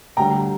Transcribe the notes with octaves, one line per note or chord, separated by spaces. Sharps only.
D2 D3 G3 G5 A#5